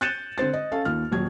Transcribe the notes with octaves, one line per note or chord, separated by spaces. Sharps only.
F#6 G6 A6 C#7 D#7 E7
D3 C4 C5 A6
D#5
C#4 A4 F5
D#2 F4 F6
D#1 F#3 G#6